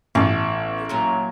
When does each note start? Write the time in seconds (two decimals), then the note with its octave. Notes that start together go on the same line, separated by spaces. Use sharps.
0.15 A1 B3 A4
0.89 A#2 F#3 A#5